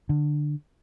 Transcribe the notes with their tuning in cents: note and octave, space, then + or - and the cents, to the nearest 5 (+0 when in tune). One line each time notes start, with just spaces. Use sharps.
D3 +15